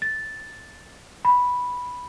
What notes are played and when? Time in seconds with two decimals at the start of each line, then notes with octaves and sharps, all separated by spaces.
0.02 A6
1.25 B5